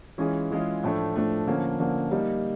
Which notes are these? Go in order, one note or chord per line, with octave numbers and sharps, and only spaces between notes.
E3 G#3 C#4 F4 G#4
E3 G#3 C#4 F4 G#4
A2 F3 A3 D4
A2 F3 A3 D4
D3 F3 A#3 C#4
D3 F3 A#3 C#4
G3 A#3 D#4